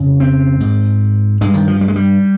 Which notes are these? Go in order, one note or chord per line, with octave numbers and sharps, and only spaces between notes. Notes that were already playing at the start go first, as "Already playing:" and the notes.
Already playing: F2 C#3
C4
G#2
G2 G#3
D#3
F3
G3
G#3
G3